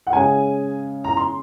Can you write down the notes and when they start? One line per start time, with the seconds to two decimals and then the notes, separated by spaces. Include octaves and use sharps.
0.07 F#5
0.13 C#3 G#3 C#4 G#4 G#5
1.04 A#5
1.17 C6